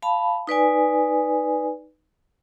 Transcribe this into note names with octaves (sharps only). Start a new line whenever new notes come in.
F5 A5 B5
D#4 B4 D5 G#5